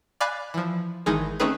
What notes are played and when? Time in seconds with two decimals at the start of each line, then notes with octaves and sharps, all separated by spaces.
0.21 D5 F5 G#5 B5 D6 F#6
0.54 E3 F3
1.06 G#1 D#3 E3 G#3 D#4 G#4
1.40 A3 C4 C#4 D#4 G#4 B4